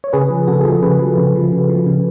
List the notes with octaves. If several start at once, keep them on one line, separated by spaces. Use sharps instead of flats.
C#5
C#3 G#4 B4
F3
C#3 F#4 A4
G#4
F3
A4
C#3 G#4 B4
F3
C#3
F3
C#3
F3
C#3